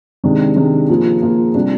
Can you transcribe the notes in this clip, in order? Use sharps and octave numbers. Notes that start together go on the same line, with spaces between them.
C3 D#3 G#3 D4
C3 D#3 G#3 D4
F3 A#3 F4 G#4
F3 A#3 F4 G#4
C3 G3 D4 F4